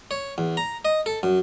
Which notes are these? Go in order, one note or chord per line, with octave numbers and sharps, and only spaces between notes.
C#5
E2
A#5
D#5
A4
F#2